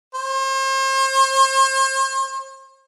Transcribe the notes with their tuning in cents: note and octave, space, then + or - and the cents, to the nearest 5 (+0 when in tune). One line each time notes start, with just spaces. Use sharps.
C5 +40